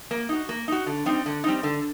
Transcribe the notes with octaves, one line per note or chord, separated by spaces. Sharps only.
A#3
D#4 F#4
A#3
D#4 F#4
D3
G3 C4 D#4
D3
G3 C4 D#4
D3